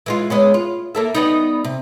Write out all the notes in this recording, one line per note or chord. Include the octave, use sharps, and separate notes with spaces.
E3 G#3 F4
G#3 B3 C#4
F4
A#3 A4 E5
G3 B3 D#4
C3